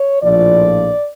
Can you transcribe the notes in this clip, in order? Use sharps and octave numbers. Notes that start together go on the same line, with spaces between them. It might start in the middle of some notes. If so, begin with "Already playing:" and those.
Already playing: C#5
A#1 A2 F3 D5